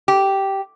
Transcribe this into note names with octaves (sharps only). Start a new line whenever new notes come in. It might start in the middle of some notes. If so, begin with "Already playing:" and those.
G4